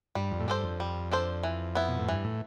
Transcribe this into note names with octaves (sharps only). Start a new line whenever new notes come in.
G2 G3
F2
A2
G2 D4 A4 C5
F2
G3
D4 A4 C5
E3
B3 E4
B2
A2
G2 E3
A2